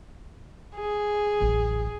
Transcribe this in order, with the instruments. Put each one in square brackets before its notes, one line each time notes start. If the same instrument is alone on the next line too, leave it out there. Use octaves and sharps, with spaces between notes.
[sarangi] G#4
[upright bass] D1 A1